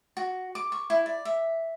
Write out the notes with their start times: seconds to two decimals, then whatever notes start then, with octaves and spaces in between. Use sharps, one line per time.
0.17 F#4
0.55 D6
0.72 C#6
0.90 E4
1.06 D5
1.25 E5